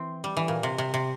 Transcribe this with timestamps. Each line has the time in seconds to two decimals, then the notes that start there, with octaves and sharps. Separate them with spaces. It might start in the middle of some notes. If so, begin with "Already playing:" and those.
Already playing: E3 C4
0.24 G3
0.37 E3
0.48 A#2
0.63 C3
0.78 C3
0.94 C3